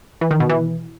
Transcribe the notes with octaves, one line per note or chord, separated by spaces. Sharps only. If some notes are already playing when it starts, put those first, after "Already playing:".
E3
D#3
B2
E3